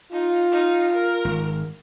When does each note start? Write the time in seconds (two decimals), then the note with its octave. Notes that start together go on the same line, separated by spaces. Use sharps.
0.12 D#4 F4
0.52 D#4 F6
0.93 A#4
1.25 G#1